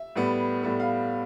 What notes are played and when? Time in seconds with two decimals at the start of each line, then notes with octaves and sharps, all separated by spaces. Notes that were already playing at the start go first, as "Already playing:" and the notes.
Already playing: E5
0.16 A2 G3 B3
0.63 A2 G3 B3
0.80 F5